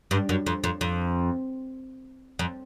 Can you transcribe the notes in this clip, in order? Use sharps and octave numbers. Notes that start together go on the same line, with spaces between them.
G2
F#2
F2
F2
F2
F2